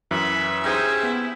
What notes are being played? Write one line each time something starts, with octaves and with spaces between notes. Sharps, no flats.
F#2 E3 E5 B5
C#4 D#4 G4 G#4 C5
B3 E4